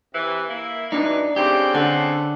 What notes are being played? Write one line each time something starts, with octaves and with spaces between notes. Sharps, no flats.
C3 E3
A#3 E4
B2 D#3 E3 D4 D#4
C#3 A3 C4 G4
D3 A4 F#5